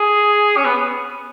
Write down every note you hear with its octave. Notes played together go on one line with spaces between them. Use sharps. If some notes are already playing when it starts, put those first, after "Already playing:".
Already playing: G#4
C#4
B3